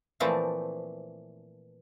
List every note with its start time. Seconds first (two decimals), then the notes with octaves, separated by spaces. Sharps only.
0.20 A#2 E3 F3 A3 C4